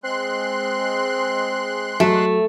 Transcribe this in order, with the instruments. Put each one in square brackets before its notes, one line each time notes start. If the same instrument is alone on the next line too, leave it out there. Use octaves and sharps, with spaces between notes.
[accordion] G#3 C6 F#6 [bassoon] C4
[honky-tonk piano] F#3 [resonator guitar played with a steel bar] A3